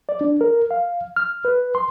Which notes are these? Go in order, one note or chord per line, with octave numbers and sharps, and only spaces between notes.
D5
D4
A#4
F5
F6
B4
C6